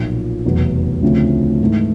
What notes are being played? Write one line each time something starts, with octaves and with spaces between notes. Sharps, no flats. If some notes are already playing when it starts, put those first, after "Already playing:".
Already playing: B1 A#2 F3
F1 E2 B2 F#3
D2 C#3 F3 A3 C4
G#2 E3 A3